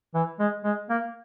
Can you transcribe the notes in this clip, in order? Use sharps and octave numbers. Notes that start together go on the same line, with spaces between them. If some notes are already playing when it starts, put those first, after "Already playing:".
E3
G#3
G#3
A#3